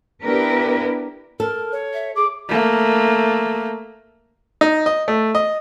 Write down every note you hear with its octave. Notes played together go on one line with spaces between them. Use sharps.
B3 D4 E4 G4 A#4 B4
A4 A#4
C#5
E5
G#4 D6
A3 A#3
D#4
D#5
A3
D#5